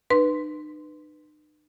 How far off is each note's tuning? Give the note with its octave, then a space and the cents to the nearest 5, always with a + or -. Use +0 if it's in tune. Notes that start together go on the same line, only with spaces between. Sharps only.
D#4 -45 B4 +0 C6 -10